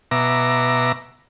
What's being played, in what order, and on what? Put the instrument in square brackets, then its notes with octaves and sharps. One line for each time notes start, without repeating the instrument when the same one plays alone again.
[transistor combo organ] B2 E5 A#5 D6